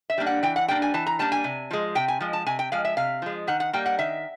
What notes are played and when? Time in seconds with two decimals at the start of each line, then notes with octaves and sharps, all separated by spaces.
0.10 E5
0.18 G3 A#3 D4
0.27 F#5
0.43 E3 G5
0.56 F#5
0.68 G3 A#3 D4 G5
0.82 G#5
0.94 E3 A5
1.07 A#5
1.19 G3 A#3 D4 A5
1.32 G#5
1.44 C3
1.71 F3 G#3
1.95 C3 G5
2.08 G#5
2.20 F3 G#3
2.33 A5
2.46 C3 G#5
2.59 G5
2.72 F3 G#3 F5
2.85 E5
2.97 C3 F5
3.22 F3 G#3
3.47 D#3 F#5
3.60 F#5
3.73 G3 A#3 G5
3.86 F#5
3.99 D#3 E5